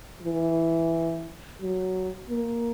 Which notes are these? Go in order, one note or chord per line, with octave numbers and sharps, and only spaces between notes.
E3
F#3
A#3